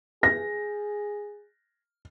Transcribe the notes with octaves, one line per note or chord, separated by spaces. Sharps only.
G#4 A#6